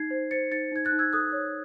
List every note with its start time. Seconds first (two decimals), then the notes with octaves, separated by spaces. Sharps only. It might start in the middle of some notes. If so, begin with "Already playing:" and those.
Already playing: D#4 G#6 C7
0.11 C5
0.31 C5 A6 C#7
0.51 D#4 A6 C#7
0.72 D#4 G#6
0.85 F#6 A6
0.92 D#4
0.99 E6 G#6
1.13 A4 D#6 F#6
1.33 C#5